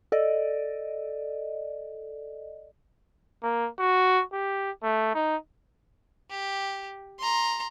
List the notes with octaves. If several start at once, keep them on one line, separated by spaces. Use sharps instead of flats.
A4 D5 D#5
A#3
F#4
G4
A3
D#4
G4
A#5 C6